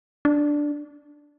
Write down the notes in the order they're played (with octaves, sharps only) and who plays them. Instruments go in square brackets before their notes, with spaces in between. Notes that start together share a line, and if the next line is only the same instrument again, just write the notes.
[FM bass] D4